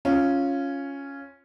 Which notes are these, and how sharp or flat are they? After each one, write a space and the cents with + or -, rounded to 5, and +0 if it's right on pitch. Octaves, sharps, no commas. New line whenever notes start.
C#4 +0 F4 +0